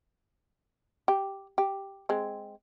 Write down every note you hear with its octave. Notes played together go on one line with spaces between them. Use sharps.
G4
G4
G#3 C4